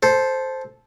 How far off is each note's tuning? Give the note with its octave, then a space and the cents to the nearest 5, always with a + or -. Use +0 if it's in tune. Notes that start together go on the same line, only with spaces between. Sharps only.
A4 -15 C5 +0